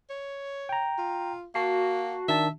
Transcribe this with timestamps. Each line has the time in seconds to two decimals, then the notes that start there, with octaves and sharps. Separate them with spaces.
0.10 C#5
0.69 G5 A#5
0.99 F4
1.55 A#3 F#4 A5 C7
2.28 D#3 D4 E5 A5